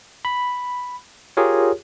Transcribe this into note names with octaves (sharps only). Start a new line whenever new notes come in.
B5
F4 G4 G#4 A#4 C#5